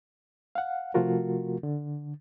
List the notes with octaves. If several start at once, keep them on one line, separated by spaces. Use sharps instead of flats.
F5 F#5
C3 F3 A3 F4 F#4 A#4
D3